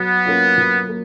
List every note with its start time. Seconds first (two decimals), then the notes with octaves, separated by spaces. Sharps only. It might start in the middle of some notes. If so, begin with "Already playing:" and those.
Already playing: F#3 B3
0.25 A#3 C#4 F4
0.58 F#3
0.89 A#3